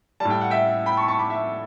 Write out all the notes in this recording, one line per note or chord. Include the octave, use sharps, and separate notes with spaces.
A2 G3 A5
G5
F#5
E5 G5
G5 B5
A5 C#6
A5 C#6
B5 D6
E5